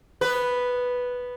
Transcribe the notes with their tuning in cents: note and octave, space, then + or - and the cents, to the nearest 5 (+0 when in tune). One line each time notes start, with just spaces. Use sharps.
B3 -5 B4 +0